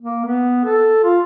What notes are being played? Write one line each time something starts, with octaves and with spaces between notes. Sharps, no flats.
A#3
B3
A4
F4